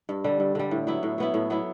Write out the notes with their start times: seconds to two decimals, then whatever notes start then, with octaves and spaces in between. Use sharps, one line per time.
0.09 G2
0.24 D3 G3
0.40 G2
0.55 D3 G3
0.71 A2
0.87 F#3 B3 E4
1.03 A2
1.18 F#3 B3 E4
1.34 A2
1.50 F#3 B3 E4